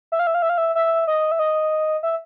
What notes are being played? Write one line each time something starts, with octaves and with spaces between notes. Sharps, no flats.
E5
F5
E5
F5
E5
F5
E5
E5
D#5
E5
D#5
E5